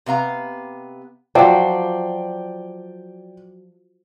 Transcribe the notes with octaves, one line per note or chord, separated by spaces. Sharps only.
C3 B3 F5 A#5
F3 F#3 D5 G5 D6